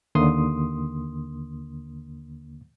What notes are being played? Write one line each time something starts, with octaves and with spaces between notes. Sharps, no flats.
D#2 D3 A#3 C6 D#6